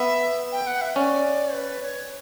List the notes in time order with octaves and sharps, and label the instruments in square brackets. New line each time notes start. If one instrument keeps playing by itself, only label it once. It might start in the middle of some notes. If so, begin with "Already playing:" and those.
Already playing: [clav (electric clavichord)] B3 [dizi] E5
[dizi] G5
F#5
E5
[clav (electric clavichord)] C#4 [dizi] D5
[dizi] B4
C#5